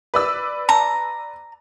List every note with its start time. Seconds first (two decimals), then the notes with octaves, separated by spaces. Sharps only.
0.14 B4 D5 E6
0.69 A5 A#5